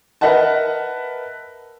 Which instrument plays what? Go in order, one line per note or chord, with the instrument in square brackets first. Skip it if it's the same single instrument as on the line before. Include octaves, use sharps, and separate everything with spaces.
[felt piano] A#4 B4 D#5 E5 F#5 A5